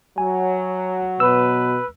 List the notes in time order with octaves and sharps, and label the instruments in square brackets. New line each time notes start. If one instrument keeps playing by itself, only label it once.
[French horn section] F#3 [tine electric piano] G#5
[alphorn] B2 [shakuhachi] B4 [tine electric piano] E6